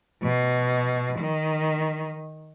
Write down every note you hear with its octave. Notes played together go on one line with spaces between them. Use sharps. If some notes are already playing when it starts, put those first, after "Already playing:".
B2
D#3